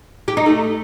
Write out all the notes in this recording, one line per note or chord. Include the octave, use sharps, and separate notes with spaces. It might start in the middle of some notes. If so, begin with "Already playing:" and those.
G4
D#4
A3